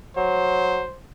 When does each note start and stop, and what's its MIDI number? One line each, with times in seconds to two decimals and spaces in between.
0.17 0.83 54
0.17 0.99 72